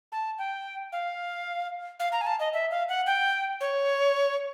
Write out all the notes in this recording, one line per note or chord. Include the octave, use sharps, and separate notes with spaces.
A5
G5
F5
F5
A#5
G#5
A5
D#5
E5
F5
F#5
G5
C#5